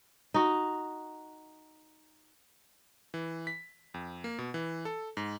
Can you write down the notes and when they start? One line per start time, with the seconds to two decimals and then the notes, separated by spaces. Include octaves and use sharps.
0.34 D#4 F#4
3.14 E3
3.47 B6
3.94 F2
4.24 A#3
4.38 B2
4.54 E3
4.85 A4
5.17 G#2